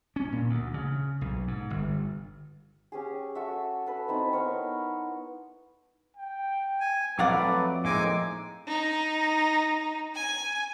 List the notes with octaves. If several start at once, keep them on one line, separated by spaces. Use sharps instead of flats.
C#4
A#2
D2
C#3
B1
G#2
G1
C#4 G4 G#4
F#4 A4 E5
A4 B4
C4 D#4 E4
B3 A#4 C5 C#5
G5
G#5
F2 F#3 A3 B4 D5 F5 F#5
A2 G#3 A#3 C4 D#4 G#5 D6
D#4
G#5